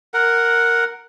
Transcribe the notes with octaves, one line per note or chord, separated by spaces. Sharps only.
A#4 F#5